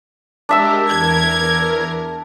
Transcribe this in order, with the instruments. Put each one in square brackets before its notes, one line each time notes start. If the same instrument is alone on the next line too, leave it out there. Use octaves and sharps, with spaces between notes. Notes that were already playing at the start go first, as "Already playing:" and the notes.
[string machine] G#3 G4 A#4 [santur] D4 E5 E6
[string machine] E2 A#4 [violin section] G#6